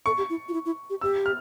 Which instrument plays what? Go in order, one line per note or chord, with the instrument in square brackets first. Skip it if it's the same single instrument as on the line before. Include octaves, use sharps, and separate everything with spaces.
[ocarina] A4 [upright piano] C#6
[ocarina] G4
E4
F4
E4
E4
G4
[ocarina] G4 [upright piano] E6
[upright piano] F6